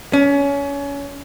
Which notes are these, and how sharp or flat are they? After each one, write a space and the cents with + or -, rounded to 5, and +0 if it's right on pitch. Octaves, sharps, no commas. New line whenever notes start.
C#4 +25